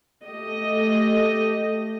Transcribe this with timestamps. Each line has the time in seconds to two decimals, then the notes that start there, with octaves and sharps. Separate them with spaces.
0.25 A3 G4 D#5